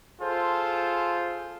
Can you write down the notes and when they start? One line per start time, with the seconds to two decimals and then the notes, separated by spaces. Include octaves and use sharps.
0.21 F4 G#4 A4 C5